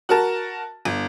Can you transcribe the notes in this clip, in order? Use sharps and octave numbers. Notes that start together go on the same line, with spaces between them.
F#4 A#4 A5
G1